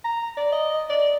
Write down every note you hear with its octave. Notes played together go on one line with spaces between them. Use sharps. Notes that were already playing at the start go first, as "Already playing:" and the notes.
A#5
D5
D#5
D5